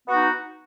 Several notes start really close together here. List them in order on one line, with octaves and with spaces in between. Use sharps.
B3 F#4 D#4